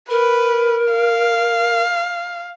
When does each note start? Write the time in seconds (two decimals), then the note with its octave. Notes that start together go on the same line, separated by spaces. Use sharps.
0.10 A#4 B4
0.93 F5